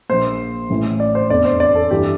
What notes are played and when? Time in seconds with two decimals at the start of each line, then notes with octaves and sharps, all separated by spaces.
0.09 A#1 A#2 C5
0.70 A1 A2 E3
1.00 D5
1.15 C5
1.30 F1 E2 D3 D5
1.45 C5
1.60 D5
1.75 A4
1.91 G2 E3 G4